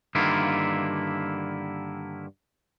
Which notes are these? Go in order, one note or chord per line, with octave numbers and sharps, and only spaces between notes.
G2 D3 D#3 A#3 E4 F4